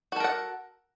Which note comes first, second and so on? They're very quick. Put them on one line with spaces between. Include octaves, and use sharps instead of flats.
F#4 A4 A#4 F#5